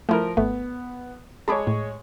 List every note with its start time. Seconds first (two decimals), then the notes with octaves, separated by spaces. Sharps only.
0.09 F3 A3 E4 A#4
0.37 G#1 A3 B3
1.48 G#3 G#4 C#5 A5 B5 D6
1.67 A2